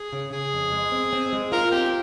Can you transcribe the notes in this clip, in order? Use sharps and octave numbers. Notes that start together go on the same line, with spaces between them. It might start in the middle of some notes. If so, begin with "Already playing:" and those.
Already playing: G#4
C#3
C#3 G#4
F2
G#3
C4
C4
G#3
F4 A#4
C4 G4